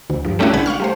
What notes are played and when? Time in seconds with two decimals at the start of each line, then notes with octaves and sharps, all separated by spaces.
0.10 D2
0.25 G2 F3
0.39 G3 A3 C#4 D4 E4 F#4
0.53 B1 D3 G#3 B4 F#5 G#6
0.66 F5 F#5 C#6 F6
0.80 G3 A3 C5